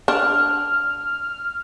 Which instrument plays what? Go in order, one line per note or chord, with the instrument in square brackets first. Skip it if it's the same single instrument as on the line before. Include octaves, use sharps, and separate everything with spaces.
[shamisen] D4 [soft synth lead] F6